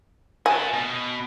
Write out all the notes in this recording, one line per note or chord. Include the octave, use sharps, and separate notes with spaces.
F#4 G#5 A5
B2